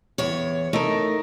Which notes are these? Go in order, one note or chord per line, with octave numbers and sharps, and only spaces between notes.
E2 C#5
A3 D#4 A#4